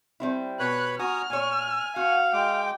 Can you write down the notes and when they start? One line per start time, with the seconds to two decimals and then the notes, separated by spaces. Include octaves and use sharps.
0.20 G3 C4 E4
0.60 B2 B4 C#5 B5 F#6
0.99 F#4 G#5 A#5 D#6 F6
1.30 A#2 C#5 G#5
1.96 F#4 F5 F#5
2.33 G#3 G5 D6